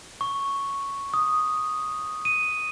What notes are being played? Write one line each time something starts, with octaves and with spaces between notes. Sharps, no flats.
C#6
D#6
D#7